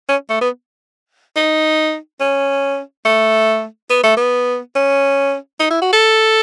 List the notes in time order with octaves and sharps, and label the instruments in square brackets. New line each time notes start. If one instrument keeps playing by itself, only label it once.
[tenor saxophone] C#4
A3
B3
D#4
C#4
A3
B3
A3
B3
C#4
D#4
E4
F#4
A4